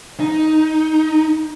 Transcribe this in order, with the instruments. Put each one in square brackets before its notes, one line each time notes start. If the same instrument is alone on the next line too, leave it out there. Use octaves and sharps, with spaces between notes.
[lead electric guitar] D#4